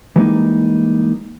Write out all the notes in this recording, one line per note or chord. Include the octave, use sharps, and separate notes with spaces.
E3 G3 G#3 A#3 D#4